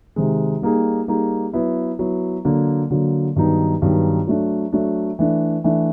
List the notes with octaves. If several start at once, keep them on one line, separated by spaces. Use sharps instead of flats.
C3 D#3 G#3
G3 A#3 D#4 G#4
G3 A#3 D#4 G#4
F#3 B3 E4
F#3 B3 E4
D3 F#3 A#3
D3 F#3 A#3
G2 D#3 F#3 B3 D#4
G2 D#3 F#3 B3 D#4
F#3 A3 D4
F#3 A3 D4
E3 A3 D4
E3 A3 D4